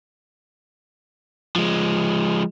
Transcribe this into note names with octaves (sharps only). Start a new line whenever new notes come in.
F3 G#3